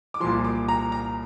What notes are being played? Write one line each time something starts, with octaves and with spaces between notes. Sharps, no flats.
D6
C2 A#2 F3 C6
D6
A#5
A#5